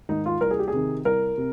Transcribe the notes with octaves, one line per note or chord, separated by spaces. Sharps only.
G#2 D#3 D#4
F4
C2 A#4
G#4
G4
G#4
C3 D#3
C2 A#4
C3